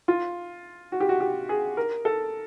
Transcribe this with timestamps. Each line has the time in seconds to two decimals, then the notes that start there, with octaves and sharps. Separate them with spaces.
0.08 F4
0.92 F#4
1.00 G4
1.09 F#4
1.20 G4
1.49 G#4
1.77 A#4
2.05 A4